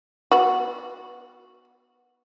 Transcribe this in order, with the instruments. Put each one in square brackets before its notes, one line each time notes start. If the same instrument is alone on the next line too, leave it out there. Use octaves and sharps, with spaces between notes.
[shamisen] B3 F#4